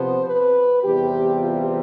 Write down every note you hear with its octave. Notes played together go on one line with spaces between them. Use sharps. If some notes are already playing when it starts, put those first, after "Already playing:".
Already playing: C3 F3 B3 C5
B4
E2 C3 G3 C4 G4
F4